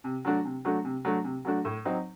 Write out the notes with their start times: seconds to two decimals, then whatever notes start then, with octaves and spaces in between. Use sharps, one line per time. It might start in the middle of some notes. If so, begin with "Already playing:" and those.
0.04 C3
0.25 F#3 A3 D4 F#4
0.45 C3
0.65 F#3 A3 D4 F#4
0.85 C3
1.05 F#3 A3 D4 F#4
1.24 C3
1.45 F#3 A3 D4 F#4
1.65 A2
1.85 F#3 C4 D#4